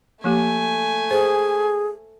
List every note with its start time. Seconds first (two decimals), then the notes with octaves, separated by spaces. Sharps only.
0.24 F3 A3 A#3 G4 G#5
1.11 G#4 C5